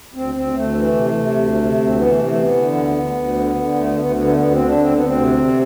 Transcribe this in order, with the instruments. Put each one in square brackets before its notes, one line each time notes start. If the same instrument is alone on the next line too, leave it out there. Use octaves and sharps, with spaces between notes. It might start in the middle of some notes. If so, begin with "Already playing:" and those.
[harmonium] D2 C4
D2 C4
D2 A3
E3
C3
C3
D2
C3
D2
C4
E3 B3
A3
C3
A3
E3
B3
D3
D2
D2
D2
D3
D3
D2 A3
D2 B3
D3 B3
A3
D2 B3
C4
D3
D4
D2 C4
D2 B3
C4
C3
C3